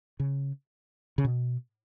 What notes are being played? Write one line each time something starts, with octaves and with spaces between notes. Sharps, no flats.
C#3
C#3
B2